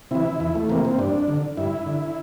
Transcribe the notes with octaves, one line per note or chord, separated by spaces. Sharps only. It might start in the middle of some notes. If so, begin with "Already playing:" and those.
C3 E3 E4
E2 E4
A3
C3 E3 A#3
C4
G2 D4
D3
G2 E4
D3